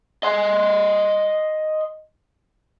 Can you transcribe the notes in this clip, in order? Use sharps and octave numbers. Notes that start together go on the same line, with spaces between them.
D#5 C6